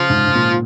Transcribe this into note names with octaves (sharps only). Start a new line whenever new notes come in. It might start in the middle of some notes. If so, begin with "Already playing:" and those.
Already playing: C#3 F3 F4
G#2
G#2
A#2